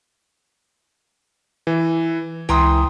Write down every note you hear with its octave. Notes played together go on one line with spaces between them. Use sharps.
E3
C#2 E3 G5 A#5 C6 D#6